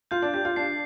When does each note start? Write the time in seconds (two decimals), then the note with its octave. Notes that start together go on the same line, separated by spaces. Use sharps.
0.11 F4 G6
0.22 D4
0.34 G4 G6
0.45 F4
0.56 D4 C7